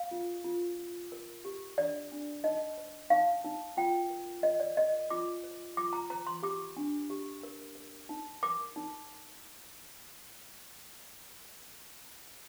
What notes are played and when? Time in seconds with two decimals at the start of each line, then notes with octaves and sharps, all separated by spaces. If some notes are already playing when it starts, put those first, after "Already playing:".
Already playing: F5
0.11 F4
0.44 F4
0.78 F4
1.12 A#4
1.45 G4
1.78 D4 D5
2.12 D4
2.44 D#4 D#5
2.77 C5
3.10 D#4 F5
3.44 D#4
3.77 F4 G5
4.10 A#4
4.43 A#4 D#5
4.60 D5
4.77 A#4 D#5
5.10 F4 D6
5.44 C5
5.77 F4 D6
5.93 A#5
6.10 C5 A#5
6.27 C6
6.43 G4 D6
6.76 D4
7.10 G4
7.43 A#4
7.75 A#4
8.09 D#4
8.43 A#4 D6
8.76 D#4